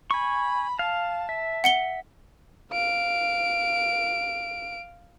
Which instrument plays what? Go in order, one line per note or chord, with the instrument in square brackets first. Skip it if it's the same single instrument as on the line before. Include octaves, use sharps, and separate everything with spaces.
[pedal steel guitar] G#5 C#6 [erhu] B5
[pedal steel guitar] F5 [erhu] A5
[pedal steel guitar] E5
[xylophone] F#5 C#7 G7
[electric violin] F5 D7